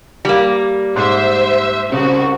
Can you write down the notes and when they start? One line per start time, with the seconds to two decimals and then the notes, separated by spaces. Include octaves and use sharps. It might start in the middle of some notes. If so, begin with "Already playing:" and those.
0.25 G3 A#3
0.96 G#2 C5 E5
1.92 C2 C#3 F#4